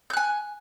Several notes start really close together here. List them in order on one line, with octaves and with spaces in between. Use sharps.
G6 F#6 G#5